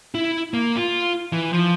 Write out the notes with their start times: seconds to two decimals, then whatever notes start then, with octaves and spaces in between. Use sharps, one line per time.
0.15 E4
0.54 A#3
0.77 F4
1.33 E3
1.53 F3